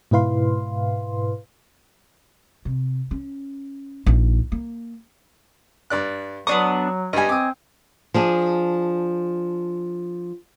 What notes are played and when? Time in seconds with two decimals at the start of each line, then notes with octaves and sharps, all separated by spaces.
0.11 G#2 B2 E4 B4 F5 C6
2.65 C3
3.11 C#4
4.06 A#1 D#4
4.52 A#3
5.90 G2 D5 F#6
6.47 F#3 B3 D4 C#6 D#6
7.13 G2 G3 D#5 G#5
7.29 C4 D6 D#6
8.14 F3 D4 G#4